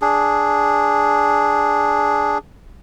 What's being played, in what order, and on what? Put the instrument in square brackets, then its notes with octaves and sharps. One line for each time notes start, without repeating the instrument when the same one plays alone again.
[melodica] D4 G#4